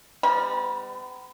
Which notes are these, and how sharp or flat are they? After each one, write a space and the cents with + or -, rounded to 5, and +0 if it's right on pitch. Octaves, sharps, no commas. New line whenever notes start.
G3 +35 B3 +45 B5 -40